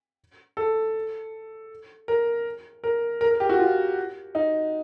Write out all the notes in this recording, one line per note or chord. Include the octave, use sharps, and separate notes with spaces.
A4
A#4
A#4
A#4
A#4
G4
F#4
F4
D#4